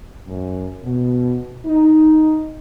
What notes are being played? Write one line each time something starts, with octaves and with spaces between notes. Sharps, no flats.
F#2
B2
D#4